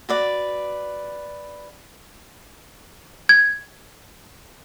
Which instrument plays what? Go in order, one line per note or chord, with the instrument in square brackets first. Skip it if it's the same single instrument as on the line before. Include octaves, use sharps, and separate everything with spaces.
[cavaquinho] F#4 B4 D5
[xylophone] G#6